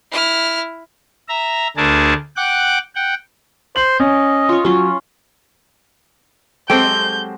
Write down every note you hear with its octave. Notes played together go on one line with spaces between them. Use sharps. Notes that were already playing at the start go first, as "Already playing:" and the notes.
E4 F6
E5 A#5
D2 A3 D4 G#4 A#4 A5
F#5 G5 D6 F#6
F#5 G5
C5 F#7
C#4 D#5
F4 C#5
F#3 C#4 F4
F#3 G#3 C4 G4 A4 C5 G5 G6